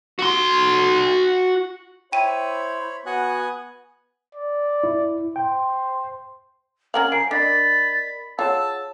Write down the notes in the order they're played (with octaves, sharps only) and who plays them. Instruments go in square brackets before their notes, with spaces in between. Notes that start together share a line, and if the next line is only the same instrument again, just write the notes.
[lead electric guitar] F#4 C6
[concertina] E4 [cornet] C5 [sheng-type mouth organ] C#5 B5 [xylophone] G5 D#7
[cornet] B3 [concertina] F#4 [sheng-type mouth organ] G#5 D#6 F#6
[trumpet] D5
[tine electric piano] E4
[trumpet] C5 [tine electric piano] G5
[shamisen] C#4 A#4 F5 [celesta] F#5 [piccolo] F#7
[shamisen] F3 [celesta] G#5 A#5 D7 [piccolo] C7
[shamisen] D4 [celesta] A#4 D5 D#5 [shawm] B5 [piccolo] A6
[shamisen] F4 [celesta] G#4 C#5 F#5 [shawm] A5 [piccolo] E6